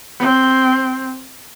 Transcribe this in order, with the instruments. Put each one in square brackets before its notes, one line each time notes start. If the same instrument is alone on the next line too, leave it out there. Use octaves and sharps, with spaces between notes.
[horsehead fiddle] C4